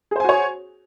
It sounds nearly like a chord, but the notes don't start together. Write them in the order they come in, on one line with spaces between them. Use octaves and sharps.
G#4 C5 G#5 F#4 C#5